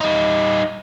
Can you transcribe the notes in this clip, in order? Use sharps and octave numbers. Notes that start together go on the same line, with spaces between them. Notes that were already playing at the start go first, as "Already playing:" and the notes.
G3 D#4